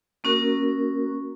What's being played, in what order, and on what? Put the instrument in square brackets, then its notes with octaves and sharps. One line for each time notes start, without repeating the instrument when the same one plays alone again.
[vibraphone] A#3 C#4 F#4 A#4